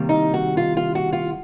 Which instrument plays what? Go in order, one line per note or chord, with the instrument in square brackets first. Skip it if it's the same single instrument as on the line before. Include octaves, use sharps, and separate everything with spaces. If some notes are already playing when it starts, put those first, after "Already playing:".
Already playing: [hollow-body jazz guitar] C3 D#3 G3 A#3
[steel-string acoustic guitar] D#4
F#4
F4
F4
F#4
F4